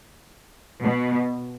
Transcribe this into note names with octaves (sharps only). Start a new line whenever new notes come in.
B2